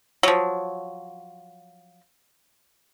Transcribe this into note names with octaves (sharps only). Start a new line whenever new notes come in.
F3 F#3